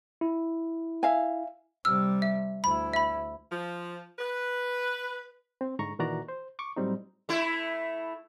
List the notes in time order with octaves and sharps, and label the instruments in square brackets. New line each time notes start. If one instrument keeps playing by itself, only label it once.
[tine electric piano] E4
[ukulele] E5 F5 G#5
[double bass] C3 G3 [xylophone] E6 F6
[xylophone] E5
[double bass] D2 E4 [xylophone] B5
[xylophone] E5 B5
[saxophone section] F3
B4
[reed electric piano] C4
G#2 D3 A#5 C#6
A#2 D#3 E3 F#4 D5 A#5
C5
C#6 D6
A2 F#3 G3 C4 D#4
[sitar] A3 E4